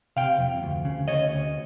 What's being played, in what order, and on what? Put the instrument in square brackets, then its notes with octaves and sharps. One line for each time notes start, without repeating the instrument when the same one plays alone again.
[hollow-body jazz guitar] C3 F5 G5
F2
D2
C#3
D2 C#5 D#5
D2